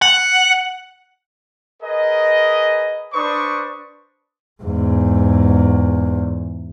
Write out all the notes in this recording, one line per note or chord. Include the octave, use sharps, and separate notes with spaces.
F#5
G#4 A#4 B4 D#5
D4 B4 C5 D5 C#6 D#6
E2 G#2